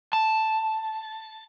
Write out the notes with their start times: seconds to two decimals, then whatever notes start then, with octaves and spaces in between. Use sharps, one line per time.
0.13 A5